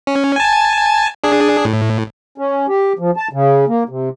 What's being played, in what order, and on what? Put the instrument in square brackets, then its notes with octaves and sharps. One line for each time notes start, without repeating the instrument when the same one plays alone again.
[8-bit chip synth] C#4
G#5 A5
D4 G#4
A2
[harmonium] C#4
G4
F3
A5
C#3
A#3
C3